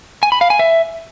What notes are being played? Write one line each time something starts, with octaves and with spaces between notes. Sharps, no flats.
G#5
B5
F5
G#5
E5